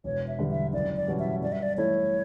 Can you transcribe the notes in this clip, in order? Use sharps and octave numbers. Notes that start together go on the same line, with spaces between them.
E1 C#5
E5
E2 D3 G3
E5
F#1 D5
D5
E2 B2 G3 C#4
E5
G2 D5
E5
D5
E3 A3 E4 A4 C#5